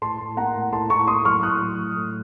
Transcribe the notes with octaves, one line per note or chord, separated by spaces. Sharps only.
A2 A5 C6
A2
A#3 F#5 A#5
A2
A2 A5 C6
A2 A#5 C#6
A#3 C6 D#6
F#3 C#6 F6
A2 D#6 F#6
F#3
F#3
A2